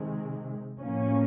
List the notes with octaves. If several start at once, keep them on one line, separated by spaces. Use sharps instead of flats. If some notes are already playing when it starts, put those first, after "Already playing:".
Already playing: C3 D#3 G#3
A2 F3 A#3 C#4